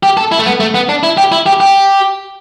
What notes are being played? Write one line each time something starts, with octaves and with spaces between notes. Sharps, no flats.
G4
A4
E4
A3
B3
A3
B3
D4
E4
G4
E4
G4
G4